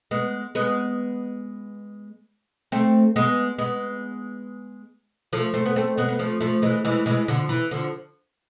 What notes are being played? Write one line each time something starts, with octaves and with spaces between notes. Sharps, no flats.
G#3 B3
G#3 B3
A3 C4
G#3 B3
G#3 B3
F3 A3
A3 C4
B3
A3 C4
G#3 B3
B3
F3 A3
F3 A3
E3 G#3
E3 G#3
E3 G#3
D3 F3
E3
D3 F3